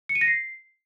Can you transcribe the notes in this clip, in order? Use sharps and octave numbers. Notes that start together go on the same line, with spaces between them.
C#7
D#7
A#6
C7